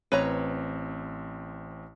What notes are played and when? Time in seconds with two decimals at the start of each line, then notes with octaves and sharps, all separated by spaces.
0.12 A1 C4 B4 C#5 A#5